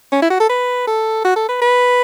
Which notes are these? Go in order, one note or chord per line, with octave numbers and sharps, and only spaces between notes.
C#4
E4
F#4
A4
B4
A4
F#4
A4
B4
B4